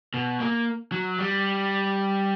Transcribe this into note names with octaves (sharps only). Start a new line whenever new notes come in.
B2
A#3
F#3
G3